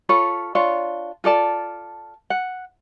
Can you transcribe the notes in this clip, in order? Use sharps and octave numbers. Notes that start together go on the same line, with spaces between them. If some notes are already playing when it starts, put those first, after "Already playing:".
F4 A4 C#5 B5
D4 F4 C#5
F4 A4 D5 A5
F#5